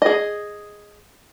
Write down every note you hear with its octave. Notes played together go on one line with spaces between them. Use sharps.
G#4 D#5